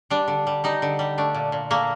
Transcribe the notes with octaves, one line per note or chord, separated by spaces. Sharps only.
G3 D4
D3
G3
G3 D#4
D3
G3
A3 D4
A#2
A#2
A3 A#3